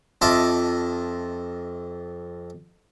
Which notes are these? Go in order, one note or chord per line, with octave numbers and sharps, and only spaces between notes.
F2 F4 D#5 E5 A5 D6